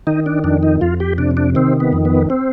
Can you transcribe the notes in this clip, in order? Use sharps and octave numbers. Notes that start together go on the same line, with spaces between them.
D#3 D#4
D4
F2 D4
D#4
F2 F4
G4
C3 D4
D4
D#3 C4
B3
F2
B3
C4